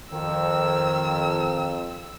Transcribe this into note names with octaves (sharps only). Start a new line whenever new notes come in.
F2 D#3 E6